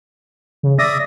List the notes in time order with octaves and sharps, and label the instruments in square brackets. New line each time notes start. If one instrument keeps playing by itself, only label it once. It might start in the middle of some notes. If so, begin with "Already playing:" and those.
[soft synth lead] C#3
[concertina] D5 E5 D#6 [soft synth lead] A#6